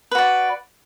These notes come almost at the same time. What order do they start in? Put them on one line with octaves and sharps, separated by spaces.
B4 F#4 D5